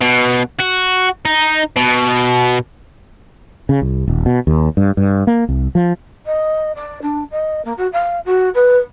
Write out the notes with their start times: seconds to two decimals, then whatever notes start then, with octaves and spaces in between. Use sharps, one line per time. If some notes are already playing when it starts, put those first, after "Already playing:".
0.01 B2
0.59 F#4
1.25 D#4
1.77 B2
3.69 C#3
3.82 C2
4.08 D#1
4.26 B2
4.47 D#2
4.77 G2
4.97 G2
5.27 A#3
5.49 C2
5.75 F3
6.26 D#5
6.75 D5
7.02 D4
7.31 D#5
7.65 A#3
7.77 F#4
7.93 F5
8.26 F#4
8.55 B4